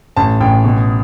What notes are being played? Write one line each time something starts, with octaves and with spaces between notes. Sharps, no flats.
A1 A5
A1 G5
B2